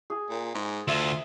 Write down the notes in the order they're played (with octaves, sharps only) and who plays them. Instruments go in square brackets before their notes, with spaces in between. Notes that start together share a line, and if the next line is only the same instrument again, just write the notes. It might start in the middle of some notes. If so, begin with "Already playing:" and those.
[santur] G#4
[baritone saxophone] A#2
[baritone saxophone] G#2 [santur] G#5
[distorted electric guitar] D2 [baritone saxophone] F4 [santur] E5